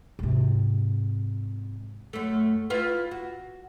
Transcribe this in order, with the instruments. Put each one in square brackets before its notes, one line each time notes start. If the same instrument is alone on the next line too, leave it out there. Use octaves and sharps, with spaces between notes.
[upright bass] G#2 C3
[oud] F#2 A3
E4 F4 B4
F#4